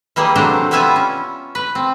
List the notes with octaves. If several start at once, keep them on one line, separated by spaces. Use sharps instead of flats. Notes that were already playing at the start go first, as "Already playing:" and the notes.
E3 G3 A#3 G#4 D#5
C3 F#3 A3 D4 A#4 C5
G3 B3 E4 F4 E5 G#5
C#4
B4
C4